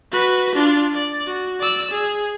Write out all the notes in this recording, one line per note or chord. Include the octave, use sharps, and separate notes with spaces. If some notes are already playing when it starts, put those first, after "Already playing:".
F#4 B4
D4 F4
D5
F#4
D5 E6
G#4